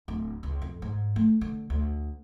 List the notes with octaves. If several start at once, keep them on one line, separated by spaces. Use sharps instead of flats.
D1
C#2
F2
G#2
A3
D3
D2